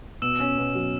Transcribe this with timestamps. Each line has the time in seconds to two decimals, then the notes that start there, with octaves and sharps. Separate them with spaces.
0.22 B2 E6 E7
0.40 C#4
0.58 B2
0.75 F#3